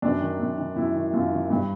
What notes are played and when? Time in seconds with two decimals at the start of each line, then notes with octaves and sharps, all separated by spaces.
0.02 F#2 D4
0.20 D#3
0.40 F#2
0.58 D#3
0.76 F#2 E4
0.95 D#3
1.13 F#2 F4
1.32 D#3
1.50 G2